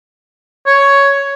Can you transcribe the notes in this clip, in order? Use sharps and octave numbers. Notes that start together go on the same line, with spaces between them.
C#5